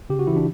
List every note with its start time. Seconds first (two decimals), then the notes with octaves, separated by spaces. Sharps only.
0.10 C#3 G4
0.19 F#4
0.27 E3 E4
0.36 D4